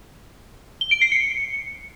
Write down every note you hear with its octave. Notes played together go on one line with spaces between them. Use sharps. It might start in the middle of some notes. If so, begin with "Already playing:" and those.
G7
D7
C7
C#7